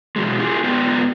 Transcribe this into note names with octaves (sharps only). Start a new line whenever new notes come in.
B2 E3 F#3 G#3
E4 F4 G4 G#4
G#2 B3 F4 B4 D5 G5